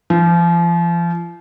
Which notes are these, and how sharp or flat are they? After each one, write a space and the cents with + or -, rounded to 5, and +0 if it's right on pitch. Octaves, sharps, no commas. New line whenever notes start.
F3 -35